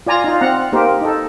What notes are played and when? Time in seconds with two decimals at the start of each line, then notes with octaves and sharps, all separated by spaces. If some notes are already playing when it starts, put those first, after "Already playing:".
0.07 F4 D5 G#5 A#5
0.24 D#4 F4
0.41 C4 F#5 A#5
0.73 A#3 D#4 G4 A#4 C5
1.01 D#4 A4